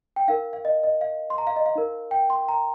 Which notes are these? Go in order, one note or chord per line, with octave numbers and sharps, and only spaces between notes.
G5
D#4 A#4 F5
F5
D#5
D#5
F5
C6
A#5
F5
D#5
F5
D#4 A#4
G5
C6
A#5